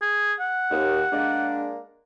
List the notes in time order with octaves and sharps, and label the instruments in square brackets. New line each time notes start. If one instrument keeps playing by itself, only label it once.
[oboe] G#4
F#5
[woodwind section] D#2
G#3 A#3 D4